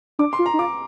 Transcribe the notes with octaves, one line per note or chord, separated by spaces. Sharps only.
D4 D6
C6
F4
A#5
D#4
F4 D6